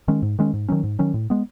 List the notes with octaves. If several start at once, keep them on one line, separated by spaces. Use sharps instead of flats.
D#3 G#3 C#4
G#2
D#3 G#3 C#4
G#2
D#3 F#3 C#4
G#2
D#3 F#3 C#4
A2
G#3 B3